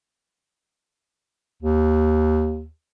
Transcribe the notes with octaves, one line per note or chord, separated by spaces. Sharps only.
D#2